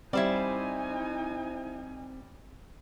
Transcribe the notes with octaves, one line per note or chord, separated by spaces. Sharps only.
G3 C4 D#4 E4 C5 D5 G#5